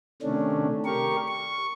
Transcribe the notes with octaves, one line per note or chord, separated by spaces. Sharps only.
C3 D#3 A3 C#4 D4
G4 A#4 C#6
C#6